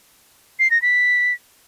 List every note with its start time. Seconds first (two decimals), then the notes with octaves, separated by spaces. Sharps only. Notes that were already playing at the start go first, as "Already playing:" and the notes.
0.59 C7
0.71 A#6
0.82 B6